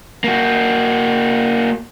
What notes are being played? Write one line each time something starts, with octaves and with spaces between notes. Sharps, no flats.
A#3 F#4